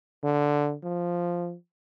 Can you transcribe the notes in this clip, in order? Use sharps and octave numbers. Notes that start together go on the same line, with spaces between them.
D3
F3